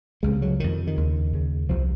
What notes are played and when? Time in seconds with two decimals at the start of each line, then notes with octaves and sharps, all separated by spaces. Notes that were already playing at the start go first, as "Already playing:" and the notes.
0.23 C#2 C3 G#3
0.42 F#3
0.60 F2 C3 D#3
0.87 D#3
0.96 D#2 C#3
1.33 D#2 C#3
1.69 C2 C3 F3